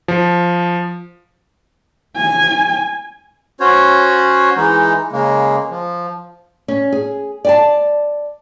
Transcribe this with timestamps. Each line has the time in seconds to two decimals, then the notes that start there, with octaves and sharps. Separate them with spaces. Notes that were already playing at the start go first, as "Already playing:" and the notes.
0.08 F3
2.17 G#5
3.60 C#4 F#4 C5 C#5
4.57 E3 G#3 D#4
5.12 C#3 G#3 A#3
5.71 F3
6.68 C#4
6.92 G#4
7.45 D5 G#5 A5